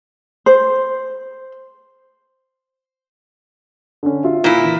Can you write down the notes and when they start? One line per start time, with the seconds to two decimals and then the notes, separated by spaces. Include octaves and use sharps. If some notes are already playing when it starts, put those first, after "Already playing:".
0.46 C5
4.03 D3 C#4
4.24 F4 E5
4.44 A#2 E4
4.64 E3